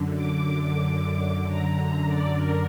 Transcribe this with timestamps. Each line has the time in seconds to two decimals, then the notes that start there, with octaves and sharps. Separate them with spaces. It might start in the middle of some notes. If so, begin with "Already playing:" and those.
Already playing: F#2 D3
0.14 D6
0.58 D6
1.48 A#5
1.77 A#5
2.07 D5
2.36 A#4